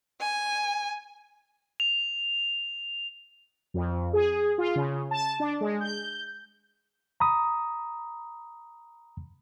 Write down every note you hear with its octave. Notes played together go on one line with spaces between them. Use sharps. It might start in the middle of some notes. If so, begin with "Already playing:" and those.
G#5
F7
F2
G#4
F4
C#3
A5
D4
G#3
G6
A#5 B5 D#6